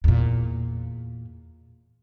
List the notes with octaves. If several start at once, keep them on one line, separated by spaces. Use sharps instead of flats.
E2 A#2